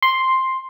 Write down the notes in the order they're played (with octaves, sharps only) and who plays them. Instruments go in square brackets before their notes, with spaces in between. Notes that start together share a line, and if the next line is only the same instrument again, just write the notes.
[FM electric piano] C6